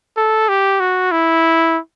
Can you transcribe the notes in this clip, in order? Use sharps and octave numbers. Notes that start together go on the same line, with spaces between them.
A4
G4
F#4
E4